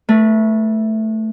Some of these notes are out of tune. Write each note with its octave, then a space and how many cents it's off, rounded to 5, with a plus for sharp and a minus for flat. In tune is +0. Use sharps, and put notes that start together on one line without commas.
A3 +0 B4 -35